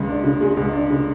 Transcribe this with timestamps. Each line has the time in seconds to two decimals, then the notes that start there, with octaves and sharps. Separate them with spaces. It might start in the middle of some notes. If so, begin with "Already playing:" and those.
Already playing: C#2 C#3 G#3
0.08 D4
0.24 C#3
0.41 G#3
0.57 C#2
0.73 D4
0.90 C#3